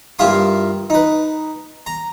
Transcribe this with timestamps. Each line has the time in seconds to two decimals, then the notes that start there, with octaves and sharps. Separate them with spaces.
0.19 G2 A#3 E4 F4 C6 D#6
0.90 D#4 B4
1.86 A#5